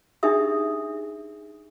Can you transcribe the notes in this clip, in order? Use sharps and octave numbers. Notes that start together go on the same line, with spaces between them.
D4 D#4 G4 G#4 E5 D#6